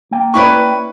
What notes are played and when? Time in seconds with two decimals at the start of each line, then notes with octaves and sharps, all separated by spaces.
0.11 A#3 G5
0.34 C#4 E4 B4 D5 C#6